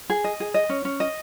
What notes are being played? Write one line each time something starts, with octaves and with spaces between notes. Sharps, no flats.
G#4
D#5
G#4
D#5
C#4
C#4
D#5